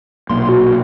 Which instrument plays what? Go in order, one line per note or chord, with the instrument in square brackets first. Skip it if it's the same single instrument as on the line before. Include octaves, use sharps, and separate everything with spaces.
[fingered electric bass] B1 A#2 [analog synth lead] C6
[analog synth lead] F#4